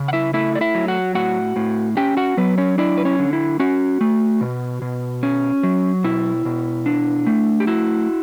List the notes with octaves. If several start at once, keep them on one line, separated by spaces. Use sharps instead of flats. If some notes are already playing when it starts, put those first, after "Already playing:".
Already playing: C#3
F#5
E4 E5
A3 E4 E5
D5
E4 E5
F#3
F#4 F#5
A2 F#4 F#5
A2
C#4 G4 G5
F#4 F#5
F#3 B3 B4
C#4 C#5
D4 E4 D5
B4
C#4 C#5
D3
E4
C#4 F#4
A3
B2
B2
C#4
F#3
B2 E4
B2
D4
A3
G4
E4 F#4